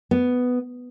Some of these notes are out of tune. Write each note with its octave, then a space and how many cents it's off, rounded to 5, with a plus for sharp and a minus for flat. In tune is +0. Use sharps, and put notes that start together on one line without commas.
B3 +5